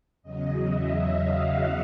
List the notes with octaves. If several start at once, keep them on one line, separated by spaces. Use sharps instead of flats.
E2 C#3 F#3 D#5
E5
F5
F#5